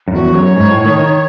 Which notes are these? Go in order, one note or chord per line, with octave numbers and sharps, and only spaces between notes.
F#2
E2 F#4
F#2 C#5
G#2
A2
D#3
D#3